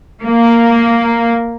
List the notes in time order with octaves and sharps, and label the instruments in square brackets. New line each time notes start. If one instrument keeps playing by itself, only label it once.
[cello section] A#3